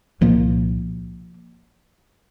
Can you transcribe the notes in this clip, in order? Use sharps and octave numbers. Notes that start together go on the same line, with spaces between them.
C2 A#2 F3 A#3